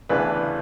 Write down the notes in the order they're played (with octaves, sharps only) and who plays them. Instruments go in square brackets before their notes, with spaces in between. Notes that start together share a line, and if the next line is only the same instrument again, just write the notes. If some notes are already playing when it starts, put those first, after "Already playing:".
[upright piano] D2 C#3 E3 B3 D4 B4